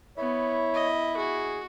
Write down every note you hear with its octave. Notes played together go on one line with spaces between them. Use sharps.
B3 E4 C#5
D#5
F#4 G#4